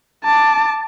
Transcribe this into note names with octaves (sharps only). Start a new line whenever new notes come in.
A5 D6